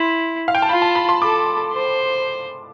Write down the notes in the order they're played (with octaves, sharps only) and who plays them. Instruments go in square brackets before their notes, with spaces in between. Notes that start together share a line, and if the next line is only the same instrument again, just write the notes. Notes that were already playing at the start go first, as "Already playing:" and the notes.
Already playing: [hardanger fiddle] E4 [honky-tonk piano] C6
[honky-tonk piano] F5
G5
A5
[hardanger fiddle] F4 [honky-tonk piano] B5
[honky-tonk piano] A5
B5
C6
[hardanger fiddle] A4 [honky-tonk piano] D6
[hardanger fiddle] C5